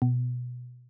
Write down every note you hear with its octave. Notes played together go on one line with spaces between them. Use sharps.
B2